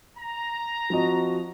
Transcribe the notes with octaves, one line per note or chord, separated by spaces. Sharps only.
A#5
F3 C4 F#4 D#5